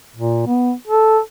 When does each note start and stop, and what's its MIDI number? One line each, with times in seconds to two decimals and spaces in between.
0.16 0.43 46
0.47 0.73 59
0.87 1.19 69